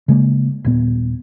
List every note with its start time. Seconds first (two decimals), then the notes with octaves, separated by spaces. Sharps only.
0.08 C#3 G#3 A#3
0.65 D#1 A#2 B3